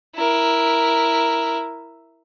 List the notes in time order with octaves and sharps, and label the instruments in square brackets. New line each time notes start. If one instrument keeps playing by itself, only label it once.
[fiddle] E4 A#4